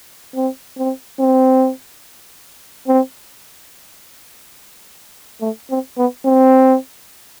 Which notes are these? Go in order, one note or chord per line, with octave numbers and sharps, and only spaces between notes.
C4
C4
C4
C4
A3
C4
B3
C4